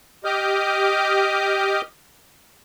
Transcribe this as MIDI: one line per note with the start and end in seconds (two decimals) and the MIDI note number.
0.25 1.81 67
0.25 1.81 75
0.25 1.81 86
0.25 1.81 87
0.25 1.81 89
0.25 1.81 91